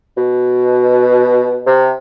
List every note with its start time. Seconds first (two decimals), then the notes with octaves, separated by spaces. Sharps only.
0.18 B2
1.67 C3